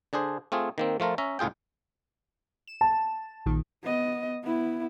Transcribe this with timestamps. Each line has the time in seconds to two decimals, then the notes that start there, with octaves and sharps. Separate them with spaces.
0.13 D3 D4 G#4 C5
0.52 A3 C4 F4 G#4
0.78 D#3 A#3 C4
1.00 F3 A3 F4 A#4
1.18 C#4 E5 A#5
1.39 C#2 A2 F4 G#4 G5
2.68 E7
2.81 A5
3.46 A#1 A#2 D#3
3.83 B3 D#5
4.43 B3 E4